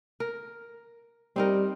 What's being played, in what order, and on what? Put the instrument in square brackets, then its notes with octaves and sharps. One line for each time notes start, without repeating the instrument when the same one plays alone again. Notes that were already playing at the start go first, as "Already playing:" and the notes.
[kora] A#4
[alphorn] G3 [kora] C4 D#4 A#4